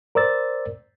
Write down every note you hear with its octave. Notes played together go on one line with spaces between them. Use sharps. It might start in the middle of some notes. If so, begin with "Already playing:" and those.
A#4 C5 D5 E6 A6